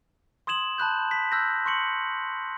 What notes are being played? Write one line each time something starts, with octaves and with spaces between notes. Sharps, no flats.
C6 D#6 G#6 E7 F#7
A5 B5 F#6 G6
B6
E6 F#6 G6 A#6
C6 C#6 C#7 F#7